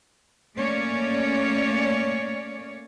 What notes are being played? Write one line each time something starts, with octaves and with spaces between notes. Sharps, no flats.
A3 A#3 C#4 C#5 D5